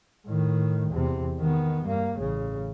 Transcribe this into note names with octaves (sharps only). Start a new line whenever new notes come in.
A2 D#3
E2 C3
D#3 B3
G2 A#3
A1 C#3